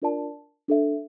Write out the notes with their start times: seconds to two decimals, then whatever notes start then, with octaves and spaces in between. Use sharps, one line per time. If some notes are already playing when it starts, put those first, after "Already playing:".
0.02 D4 F4 A#4 D5 A5
0.68 D4 A4 E5